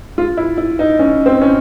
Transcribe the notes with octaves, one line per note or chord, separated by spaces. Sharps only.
F4
E4
E4
D#4
C#4
C4
C#4